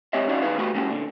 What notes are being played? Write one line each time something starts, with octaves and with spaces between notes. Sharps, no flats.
G#2 C4 G4 C#5 D#5 E5
C#4 D#4 F#4 D5 D#5 F5
E2 C3 D#4 G#4 B4 F5
A3 B3 F#4 G4 B4
G#3 A#3 C#4 F#4 G4
A#2 D3